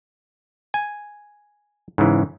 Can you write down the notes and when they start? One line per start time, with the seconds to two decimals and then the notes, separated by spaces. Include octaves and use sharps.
0.74 G#5
1.98 G#2 C#3 E3